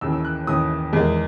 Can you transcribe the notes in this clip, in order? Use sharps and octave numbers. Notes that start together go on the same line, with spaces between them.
D#2 C#3 E3 E6
E6
F#6
D#2 C#3 E3 D#6
E2 D#3 G#3